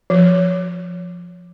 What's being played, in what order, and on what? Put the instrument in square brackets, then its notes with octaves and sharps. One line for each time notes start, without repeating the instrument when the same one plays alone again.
[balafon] F3